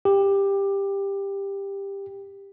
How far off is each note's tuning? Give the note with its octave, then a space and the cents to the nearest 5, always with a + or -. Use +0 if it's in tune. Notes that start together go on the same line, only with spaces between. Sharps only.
G4 +15